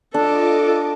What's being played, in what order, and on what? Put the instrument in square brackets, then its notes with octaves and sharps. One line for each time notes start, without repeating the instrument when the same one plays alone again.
[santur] D4 [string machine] F4 D#5 D6 [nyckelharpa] A4